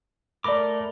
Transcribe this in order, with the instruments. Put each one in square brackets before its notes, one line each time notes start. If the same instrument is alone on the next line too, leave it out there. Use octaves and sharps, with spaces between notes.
[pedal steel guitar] A3 A#4 D6 [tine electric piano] D5 B5